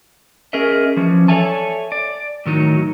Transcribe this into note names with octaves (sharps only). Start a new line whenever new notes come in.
C#4 G#4 A#4 D#5 E5
E3 F3 C#4
A4 C#5 D5 E5 G#5 A5
D5
A2 D#3 F#3 D#4